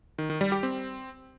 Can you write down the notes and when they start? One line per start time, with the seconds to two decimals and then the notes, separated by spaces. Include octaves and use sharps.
0.18 D#3
0.30 D#3
0.41 G3
0.52 G4
0.63 C4